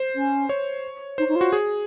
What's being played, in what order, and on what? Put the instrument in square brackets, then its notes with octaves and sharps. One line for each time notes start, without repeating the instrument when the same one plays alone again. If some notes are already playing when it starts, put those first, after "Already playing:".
Already playing: [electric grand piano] C5
[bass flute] C#4
[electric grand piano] C#5
[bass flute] D#4 [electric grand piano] C5
[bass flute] D#4
F4
[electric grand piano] F#4
G#4